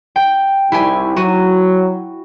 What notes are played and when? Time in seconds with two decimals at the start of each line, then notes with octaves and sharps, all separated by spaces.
0.16 G5
0.72 C2 E4 G4 G#5
1.17 F#3 F#4 D#7